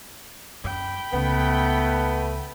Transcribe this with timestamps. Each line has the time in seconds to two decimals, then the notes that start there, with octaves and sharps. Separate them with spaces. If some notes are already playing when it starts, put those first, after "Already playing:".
0.64 F#2 G5 B5
1.13 C#2 A3 B3